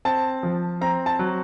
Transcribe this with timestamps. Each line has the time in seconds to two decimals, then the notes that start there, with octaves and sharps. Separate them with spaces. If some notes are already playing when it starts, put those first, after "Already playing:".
0.05 C4 A5
0.43 F3
0.81 C4 A#5
1.06 A5
1.19 F#3